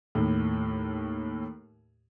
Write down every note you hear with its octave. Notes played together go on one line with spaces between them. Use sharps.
D#2 A2